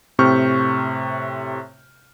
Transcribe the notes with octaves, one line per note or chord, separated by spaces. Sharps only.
A2 C3 C4 C#6 F6 G6